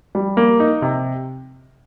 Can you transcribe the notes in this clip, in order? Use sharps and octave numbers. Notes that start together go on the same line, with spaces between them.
G3
A#3
D#4
C3